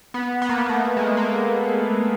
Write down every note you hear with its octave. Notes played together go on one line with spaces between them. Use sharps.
B3
B3
A#3
B3
A3
G#3
A#3